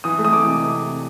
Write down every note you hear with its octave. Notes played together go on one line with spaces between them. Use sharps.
E3 D#6
A3
D#6
E3 D6
C3